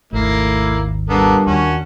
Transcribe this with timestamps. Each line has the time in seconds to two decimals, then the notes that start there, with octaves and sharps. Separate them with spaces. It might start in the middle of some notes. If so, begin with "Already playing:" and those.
0.12 G#1 D#2 A3 A#3 E4
1.09 A#2 G3 A#3 B3 D4 A4
1.47 D#2 C#4 F#4